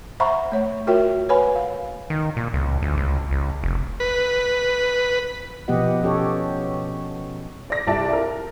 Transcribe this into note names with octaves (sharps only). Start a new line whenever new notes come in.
C5 E5 F#5 A#5 B5 C#6
A3 C#5
F4 F#4 A#4 C#5 E5 G5
B4 C#5 F#5 G#5 B5
F5
D#3
A#2
C#2
D2
C#2
C#2
F1
B4
B2 F3 B3 G4 D#5 F#5
C#4 G4 A4 C#5
D5 A#6
C2 G3 F4 D5 E5 A5
A#4